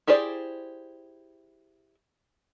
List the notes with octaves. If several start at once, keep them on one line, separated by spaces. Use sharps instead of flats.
E4 G4 G#4 C5 D5